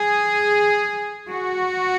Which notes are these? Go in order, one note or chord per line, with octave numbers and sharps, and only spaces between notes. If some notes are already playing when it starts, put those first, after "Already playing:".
Already playing: G#4
F#4